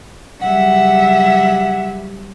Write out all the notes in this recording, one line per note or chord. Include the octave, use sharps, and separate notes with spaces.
C#3 F#3 G3 E5 F#5